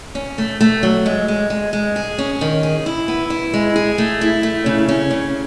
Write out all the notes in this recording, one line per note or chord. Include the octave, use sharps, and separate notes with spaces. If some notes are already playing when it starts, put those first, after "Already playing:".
C#4
A3
A3
F#3
G#3
G#3
G#3
G#3
G#4
C#4
D#3
G#4
E4
B3
E4
G#3
G#4
A3
E4
A3
C#3
C#4
C#3